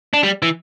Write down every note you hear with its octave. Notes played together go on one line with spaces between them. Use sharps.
D4
G3
E3